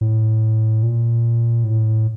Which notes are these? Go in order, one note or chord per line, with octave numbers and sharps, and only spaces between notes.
A2
A#2
A2